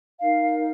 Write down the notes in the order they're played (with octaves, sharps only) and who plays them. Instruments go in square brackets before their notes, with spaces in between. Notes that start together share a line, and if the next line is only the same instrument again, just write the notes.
[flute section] D#4 A#4 F5